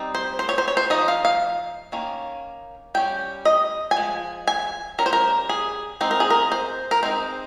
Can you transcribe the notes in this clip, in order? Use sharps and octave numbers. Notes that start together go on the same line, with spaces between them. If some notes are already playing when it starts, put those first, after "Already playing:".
Already playing: G3 C4 D#4
C5
C5
C#5
C5
C#5
C5
F3 A#3 D#4 D#5
F5
F5
D#3 A#3 C#4
G3 C#4 G5
D#5
G#5
F3 G#3
G#5
G3 C#4 A#4
C5
A#4
G#4
G#3 C4 D#4 C5
A#4
G#4
A#4
C5
A#4
G#3 C4 D#4 C5